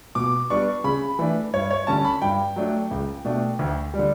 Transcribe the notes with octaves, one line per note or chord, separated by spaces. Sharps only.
B2 D6
G3 B3 D4 C#6
C#3 B5
E3 A3 D4
G2 C#5
C#5
D3 G3 C#4 A5
B5
G2 G5
F#3 A3 D4
C#2
B2 A3 D4
D2
G3
D3